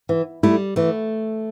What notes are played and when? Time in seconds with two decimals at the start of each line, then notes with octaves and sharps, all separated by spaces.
0.09 E3
0.43 G3 A3 E4
0.76 E3 A3